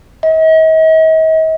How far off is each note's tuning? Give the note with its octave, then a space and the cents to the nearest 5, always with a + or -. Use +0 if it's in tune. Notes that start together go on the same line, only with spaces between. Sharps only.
D#5 +45